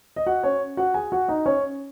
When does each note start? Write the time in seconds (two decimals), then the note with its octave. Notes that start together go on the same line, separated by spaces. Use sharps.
0.16 D#5
0.26 F#4 F#5
0.43 C#4 C#5
0.77 F#4 F#5
0.94 G#4 G#5
1.12 F#4 F#5
1.28 D#4 D#5
1.46 C#4 C#5